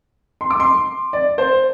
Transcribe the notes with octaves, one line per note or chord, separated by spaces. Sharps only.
C6
D6
C6
D5
C5